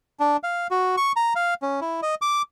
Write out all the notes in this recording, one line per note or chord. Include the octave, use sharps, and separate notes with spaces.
D4
F5
F#4
C#6
A#5
F5
C#4
E4
D#5
D6